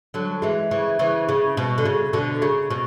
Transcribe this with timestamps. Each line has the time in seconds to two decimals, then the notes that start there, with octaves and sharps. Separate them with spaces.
0.14 D3 F#3
0.42 E3 G#3
0.71 C#3 E3
0.99 C#3 E3
1.29 C#3
1.57 B2
1.78 D3
1.85 C#3
2.13 B2 D3
2.42 C#3
2.70 B2